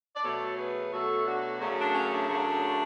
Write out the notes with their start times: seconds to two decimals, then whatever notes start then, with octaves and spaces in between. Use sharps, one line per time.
0.16 D5
0.24 B2 F#3 A3 A4 C#5
0.58 G#4 B4
0.93 B2 F#3 A3 F#4 A4
1.26 D4 F#4
1.60 F#2 C#3 F#3 A3
1.78 D4
1.95 C#4
2.12 D4
2.29 F#2 C#3 F#3 A3